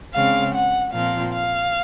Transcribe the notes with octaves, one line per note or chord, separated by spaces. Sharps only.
C#3 G#3 C4 F5
F#5
A#2 F3 C4 F5
F5